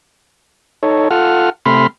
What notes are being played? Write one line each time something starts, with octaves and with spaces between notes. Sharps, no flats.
D#4 A4 C#5
F4 A4 F#5 F6
C3 A3 B5 C6 F6